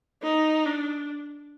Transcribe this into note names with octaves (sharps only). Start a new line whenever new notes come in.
D#4
D4